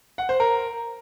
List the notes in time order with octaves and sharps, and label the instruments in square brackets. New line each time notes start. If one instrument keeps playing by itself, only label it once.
[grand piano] F#5
C5
A#4